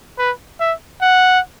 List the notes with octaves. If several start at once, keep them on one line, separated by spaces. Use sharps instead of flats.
B4
E5
F#5